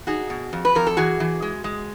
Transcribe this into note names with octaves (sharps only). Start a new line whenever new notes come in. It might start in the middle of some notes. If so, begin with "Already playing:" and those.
D#4 F#4 G#4
B2
F2
B4
F2 A#4
A4
E3 F#4 G#4
E3
G#3
G#3